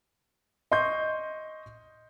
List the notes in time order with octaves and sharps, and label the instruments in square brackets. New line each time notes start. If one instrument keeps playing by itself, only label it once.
[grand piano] D#5 C6 C#6 G6